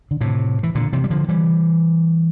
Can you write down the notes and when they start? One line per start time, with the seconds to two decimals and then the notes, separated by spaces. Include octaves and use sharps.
0.11 D3
0.21 A2 C3
0.63 E3
0.75 A#2 D3
0.93 C3 E3
1.04 G3
1.10 D3 F3
1.29 E3 G3